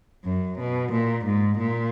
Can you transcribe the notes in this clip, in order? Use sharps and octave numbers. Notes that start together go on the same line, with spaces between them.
F#2
B2
A#2
G#2
A#2